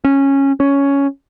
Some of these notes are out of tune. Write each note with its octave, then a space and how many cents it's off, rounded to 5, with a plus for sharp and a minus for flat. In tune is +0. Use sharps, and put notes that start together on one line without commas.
C#4 -10
C#4 +10